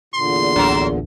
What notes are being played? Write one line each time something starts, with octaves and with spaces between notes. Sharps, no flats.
E2 A#2 D3 C6
D1 A1 F#3 D4 A#4